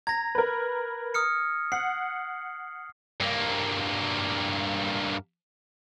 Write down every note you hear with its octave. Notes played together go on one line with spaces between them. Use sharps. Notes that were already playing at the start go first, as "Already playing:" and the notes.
A#5 G#6 A#6
A#4 B4
D#6 F6 C#7
F#5 C7
G2 A#3